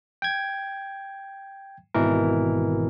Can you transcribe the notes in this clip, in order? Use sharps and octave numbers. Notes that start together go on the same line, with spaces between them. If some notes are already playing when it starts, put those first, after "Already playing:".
G5 G#6
G#1 B2 E3 A#4